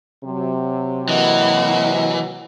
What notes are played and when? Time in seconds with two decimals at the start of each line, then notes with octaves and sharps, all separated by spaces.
0.24 C3 F#3
1.09 E3 A#3 F#4 A#4 D#5